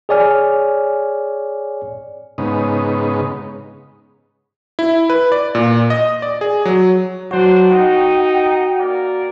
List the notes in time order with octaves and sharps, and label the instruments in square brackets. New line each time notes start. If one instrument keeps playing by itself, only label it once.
[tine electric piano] G#4 C#5 D5 G#5 F6
[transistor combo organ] G#2 C#3 B3 D#4
[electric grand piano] E4
B4
D5
A#2
D#5
D5
G#4
F#3
[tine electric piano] F#3 F#4 [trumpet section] D4 C5
[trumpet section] D#4 [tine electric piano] F#4 [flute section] F#5 G5
[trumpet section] A#3 A#4 D5